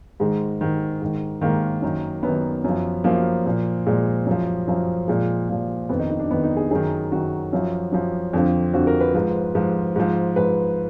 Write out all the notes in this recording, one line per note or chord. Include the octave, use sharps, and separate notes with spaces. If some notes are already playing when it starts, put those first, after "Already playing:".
G#2 D#3 G#3
G#2 D#3
G#2 D#3
G#2 D#3 A#3
F#2 D#3
F#2 D#3 B3
F#2 F3
F#2 F3 A#3
A#2 F3
A#2 F3 G#3
F#2 F3
F#2 F3
A#2 F3 G#3
A#2 F3
F2 D#3 B3
D#4
D#4
D4
F2 D#3 B3
D#4
G#4
F#2 D#3 G#4
F#2 D#3 F#4
F#2 F3
F#2 F3
F2 D3 F3
F2 D3 F3 F#4
A#4
B4
G#2 F3 B4
G#2 F3
G#2 F3
G#2 F3 B4